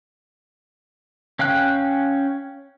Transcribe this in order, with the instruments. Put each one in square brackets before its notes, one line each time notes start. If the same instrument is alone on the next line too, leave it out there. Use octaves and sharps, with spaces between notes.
[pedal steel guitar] C#4 F5 G5 F#6